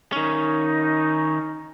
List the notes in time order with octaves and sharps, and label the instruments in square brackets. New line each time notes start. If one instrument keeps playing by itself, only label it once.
[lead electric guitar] D#3 C#4 [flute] D#4